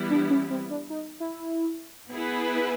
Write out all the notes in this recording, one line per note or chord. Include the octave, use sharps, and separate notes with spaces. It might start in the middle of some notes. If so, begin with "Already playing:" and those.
Already playing: E3 G3 B3 E4
D4
C#4
C4
D4
D#4
E4
B3 E4 G#4 B4